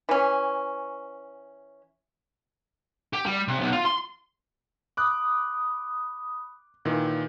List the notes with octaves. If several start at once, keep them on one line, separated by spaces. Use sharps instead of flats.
E3 C#4
G4
G3
C3
B1
F4
C6
B5 D6 D#6 F#6
A#2 D#3 E3